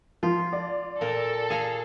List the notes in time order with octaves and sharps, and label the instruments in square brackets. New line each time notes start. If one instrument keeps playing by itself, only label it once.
[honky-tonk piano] F3 [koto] F4
[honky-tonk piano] D5
[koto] A#2 A#4 [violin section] A4
[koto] G#4 F5 A#5